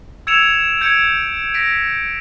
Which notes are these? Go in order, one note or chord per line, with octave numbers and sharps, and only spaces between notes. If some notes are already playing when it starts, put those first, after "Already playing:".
E6 G#6 C#7 D7 E7 F7
G6 G#6 C#7 D7
A#6 B6 D7